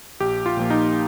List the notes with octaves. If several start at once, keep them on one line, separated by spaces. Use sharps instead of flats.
A#1 G4
F4
A#2 F3 A#3
D#4